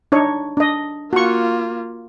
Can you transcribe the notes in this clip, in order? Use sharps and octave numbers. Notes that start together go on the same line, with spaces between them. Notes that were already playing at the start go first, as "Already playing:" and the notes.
D4 D#4 C#5
D4 D#5
A#3 F4 F#4 C#6